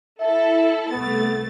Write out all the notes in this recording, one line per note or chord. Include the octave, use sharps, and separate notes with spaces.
E4 A4 E5
C2 A3 B3 A6